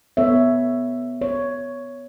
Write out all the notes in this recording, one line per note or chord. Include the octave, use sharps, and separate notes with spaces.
B3 A4 C#5 E5
C#5